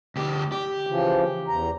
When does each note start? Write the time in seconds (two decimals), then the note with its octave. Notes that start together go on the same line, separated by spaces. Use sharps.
0.16 D2 G4
0.52 G4
0.87 C#3 E3 F3
1.48 E2 A#5